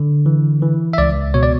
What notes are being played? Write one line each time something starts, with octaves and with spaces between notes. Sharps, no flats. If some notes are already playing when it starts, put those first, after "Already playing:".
Already playing: D3
E3
E3
E5
C#2 D5
B2 C#5
D5